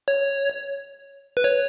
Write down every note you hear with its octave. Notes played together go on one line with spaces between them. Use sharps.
C#5
B4
C#5